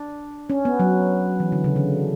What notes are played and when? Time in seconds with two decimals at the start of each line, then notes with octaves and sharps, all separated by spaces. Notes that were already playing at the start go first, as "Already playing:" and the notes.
Already playing: D4
0.50 C#4
0.65 B3
0.79 F#3
1.40 E3
1.52 D3
1.64 C#3
1.76 D3